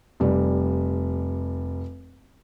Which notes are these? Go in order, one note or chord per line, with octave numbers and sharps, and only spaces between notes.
F1 G3